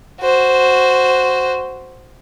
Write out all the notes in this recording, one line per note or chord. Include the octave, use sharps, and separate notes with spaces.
F#4 C5